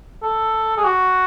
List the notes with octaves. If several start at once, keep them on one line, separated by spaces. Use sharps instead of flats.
A4
G#4
F#4